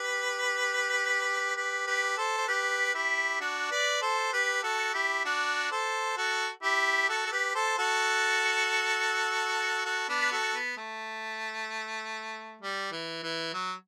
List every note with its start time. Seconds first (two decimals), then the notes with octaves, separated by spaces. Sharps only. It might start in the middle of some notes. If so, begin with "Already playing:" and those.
Already playing: G4 B4
1.56 G4 B4
1.87 G4 B4
2.17 A4 C5
2.37 C5
2.48 G4 B4
2.94 E4 G4
3.40 D4 F#4
3.71 B4 D5
4.02 A4 C5
4.33 G4 B4
4.63 F#4 A4
4.94 E4 G4
5.25 D4 F#4
5.71 A4 C5
6.17 F#4 A4
6.63 E4 G4
7.09 F#4 A4
7.26 A4
7.32 G4 B4
7.55 A4 C5
7.78 F#4 A4
9.85 F#4 A4
10.09 B3 D4
10.21 B4
10.31 F#4 A4
10.54 B3
10.77 A3
12.61 G3
12.92 E3
13.24 E3
13.54 F#3